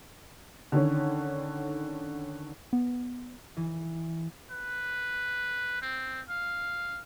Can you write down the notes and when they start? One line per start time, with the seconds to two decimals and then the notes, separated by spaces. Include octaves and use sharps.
0.72 D3 D#3 C#4
2.73 B3
3.57 E3
4.51 B4
5.82 C4
6.29 F5